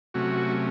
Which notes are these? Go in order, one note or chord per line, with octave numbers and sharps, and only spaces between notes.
C3 F#3 A3 C#4 F#4